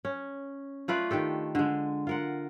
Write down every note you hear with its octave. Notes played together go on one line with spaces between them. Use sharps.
C#4
A3 F4 B4 D5
D#3 D4 G4 A4
D3 G#3
F4 A#4 F#5